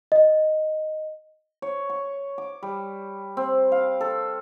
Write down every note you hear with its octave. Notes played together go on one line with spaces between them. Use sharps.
D#5
C#5
C#6
D6
G3
C4
F5
A4